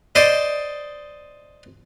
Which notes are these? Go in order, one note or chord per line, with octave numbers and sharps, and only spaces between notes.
C5 D5 D#5